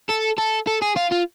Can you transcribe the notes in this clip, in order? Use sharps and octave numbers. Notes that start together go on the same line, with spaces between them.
A4
A4
A4
G#4
F4
F4